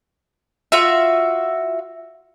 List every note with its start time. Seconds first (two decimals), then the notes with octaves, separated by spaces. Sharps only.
0.72 F4 F#4 E5